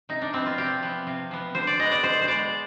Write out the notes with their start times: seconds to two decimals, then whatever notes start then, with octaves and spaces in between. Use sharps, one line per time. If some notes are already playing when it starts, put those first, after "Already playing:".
0.09 C3 D#4
0.22 D4
0.33 F3 B3 C4
0.46 F4
0.57 C3 G4
0.83 F3 B3
1.07 C3
1.31 F3 B3
1.55 D3 C5
1.67 D5
1.79 G#3 B3 D#5
1.92 D5
2.03 D3 C5
2.22 C5
2.27 G#3 B3 D5